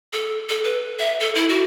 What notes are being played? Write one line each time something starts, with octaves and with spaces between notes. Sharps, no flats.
A4
A4
B4
E5
A4
E4
F#4